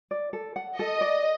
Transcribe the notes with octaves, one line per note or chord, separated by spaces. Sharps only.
D5
A4
F#5
A4 D#5
D5